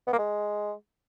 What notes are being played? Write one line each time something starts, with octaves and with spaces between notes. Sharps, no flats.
B3
A#3
G#3